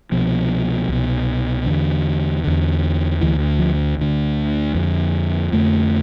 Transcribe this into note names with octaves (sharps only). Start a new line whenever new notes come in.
C2 B2 F3
C2 B2
E2 D3
E2 D3
D2 D3 E3
F3
D2 D3
F2 D3
F2 D3 A3